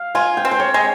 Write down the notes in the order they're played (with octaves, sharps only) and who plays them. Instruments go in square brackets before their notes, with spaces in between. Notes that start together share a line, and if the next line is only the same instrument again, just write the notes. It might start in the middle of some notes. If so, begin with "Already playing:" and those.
Already playing: [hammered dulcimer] F5
[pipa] F4 [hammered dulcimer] G#5
[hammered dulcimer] G5
[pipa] C4
[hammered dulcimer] C5
C#5
[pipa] G#3